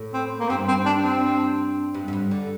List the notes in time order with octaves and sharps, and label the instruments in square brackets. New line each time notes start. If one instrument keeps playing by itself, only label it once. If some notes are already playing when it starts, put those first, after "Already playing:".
Already playing: [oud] A2
[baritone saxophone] C4
A#3
[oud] G2 [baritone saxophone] C4
[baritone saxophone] C4
D4
C4
[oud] G2
F#2
G2
D3